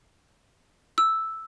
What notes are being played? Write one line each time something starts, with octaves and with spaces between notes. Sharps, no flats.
E6